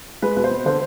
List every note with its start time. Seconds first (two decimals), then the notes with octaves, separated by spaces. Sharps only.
0.22 G#3 B4
0.37 B2 B4
0.44 C5
0.51 B2
0.66 D3 C5